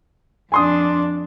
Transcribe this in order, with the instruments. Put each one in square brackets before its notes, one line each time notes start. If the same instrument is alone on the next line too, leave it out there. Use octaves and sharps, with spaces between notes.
[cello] F2 D4 [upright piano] G#5 C6 D#6